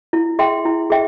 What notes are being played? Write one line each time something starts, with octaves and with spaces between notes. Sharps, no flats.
E4
G#4 E5 G5 C6
E4
G#4 E5 G5